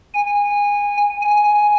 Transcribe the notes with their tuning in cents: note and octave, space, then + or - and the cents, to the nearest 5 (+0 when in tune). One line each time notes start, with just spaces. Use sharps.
G#5 -20
G#5 +5